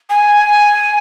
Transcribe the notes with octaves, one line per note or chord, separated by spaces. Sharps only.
G#5